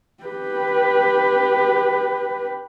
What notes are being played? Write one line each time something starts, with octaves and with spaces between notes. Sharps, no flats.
G4 B4